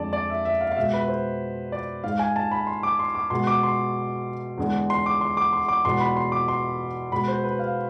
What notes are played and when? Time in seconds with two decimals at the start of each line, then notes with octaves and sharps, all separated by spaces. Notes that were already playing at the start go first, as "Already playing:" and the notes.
Already playing: F2 D3 G#3 D5 A5
0.13 D5
0.30 E5
0.45 E5
0.61 F5
0.72 F5
0.77 B2 G#3 E5
0.93 B4
1.08 C5
1.72 D5
2.04 G#2 G#3 F5
2.19 G#5
2.36 A5
2.51 B5
2.67 C6
2.83 D6
2.99 C6
3.15 D6
3.30 B2 G#3 C6
3.47 D6
3.63 C6
4.58 E2 D3 G#3
4.90 C6
5.06 D6
5.21 C6
5.37 D6
5.53 C6
5.68 D6
5.84 E2 B2 G#3 C6
6.00 B5
6.17 C6
6.32 D6
6.48 C6
7.12 B2 G#3 B5
7.28 C5
7.44 B4
7.59 F5